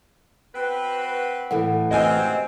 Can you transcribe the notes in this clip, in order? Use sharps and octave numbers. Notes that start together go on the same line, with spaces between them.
C4 F#4 B4
A2 E3 A3 F#5
F#2 C3 C4 D#5 G#5